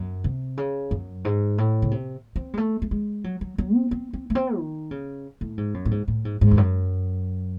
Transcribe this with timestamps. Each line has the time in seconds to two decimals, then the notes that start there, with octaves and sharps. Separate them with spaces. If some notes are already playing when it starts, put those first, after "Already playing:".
Already playing: F#2
0.24 C3
0.57 C#3
0.91 F#2
1.25 G#2
1.58 A2
1.82 C#3
1.91 C3
2.36 C4
2.54 G#3
2.58 A3
2.82 A3
2.91 G#3
3.24 F#3
3.41 F#3
3.58 F#3
3.75 C4
3.91 C4
4.13 C4
4.30 A3
4.35 C4
4.58 D#3
4.91 C#3
5.41 A2
5.58 G#2
5.74 F#2
5.85 A2
5.91 G#2
6.08 A2
6.25 G#2
6.41 G#2
6.51 E2
6.57 F#2